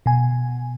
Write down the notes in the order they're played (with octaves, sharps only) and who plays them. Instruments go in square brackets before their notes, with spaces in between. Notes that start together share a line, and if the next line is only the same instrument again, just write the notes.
[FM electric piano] B2 G#5